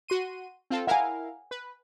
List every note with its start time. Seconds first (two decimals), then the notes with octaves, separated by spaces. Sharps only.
0.08 F#4 C6 D#7
0.70 C4 F4 A4
0.87 E4 A#4 F5 F#5 G#5
1.51 B4